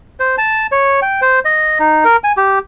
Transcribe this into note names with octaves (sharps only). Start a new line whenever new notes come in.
C5
A5
C#5
G5
C5
D#5
D#4
A#4
G#5
G4